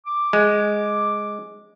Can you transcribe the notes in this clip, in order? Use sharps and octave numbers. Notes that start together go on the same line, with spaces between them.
D6
G#3